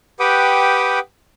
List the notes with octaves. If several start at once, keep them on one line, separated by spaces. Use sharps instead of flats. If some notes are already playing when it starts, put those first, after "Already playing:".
G4 B4 F#5 G5 D6 D#6